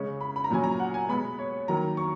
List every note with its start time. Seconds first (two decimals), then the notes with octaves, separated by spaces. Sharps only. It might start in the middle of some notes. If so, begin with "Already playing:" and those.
Already playing: C#3 G#3 C#4
0.21 B5
0.36 B5
0.44 A#5
0.51 A#2 F#3 C#4 G#5
0.64 A#5
0.80 F#5
0.94 G#5
1.09 B2 G#3 B3 B5
1.39 C#5
1.68 D#3 F#3 A#3 A#5
1.97 C#6